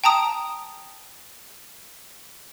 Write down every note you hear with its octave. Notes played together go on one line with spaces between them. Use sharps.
G5 A5 A#5 D#6